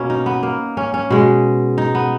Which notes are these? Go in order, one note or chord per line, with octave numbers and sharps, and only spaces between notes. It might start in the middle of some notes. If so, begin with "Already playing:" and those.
Already playing: B2 A#3 C#4
D#4
B3
A#3
C#4
C#4
B2 G#3
D#4
B3